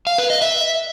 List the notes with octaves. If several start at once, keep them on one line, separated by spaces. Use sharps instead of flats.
F5
B4
D#5
E5